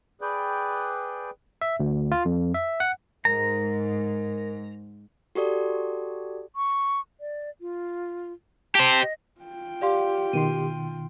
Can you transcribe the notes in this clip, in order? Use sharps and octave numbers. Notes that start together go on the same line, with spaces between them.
G#4 B4 D5 G5
E5
D2
F4
F2
E5
F#5
G#2 A#4 A#5
F#4 G4 A4 D5
C#6
D5
F4
G4 C5 A5
D#5
F4 G5
G4 D5 F5 C6
B2 D#3 C6 D#7